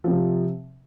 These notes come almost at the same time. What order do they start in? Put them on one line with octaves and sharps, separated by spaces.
F3 C4 C3